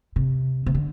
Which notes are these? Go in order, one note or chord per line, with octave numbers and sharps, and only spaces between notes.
C3
C3
D3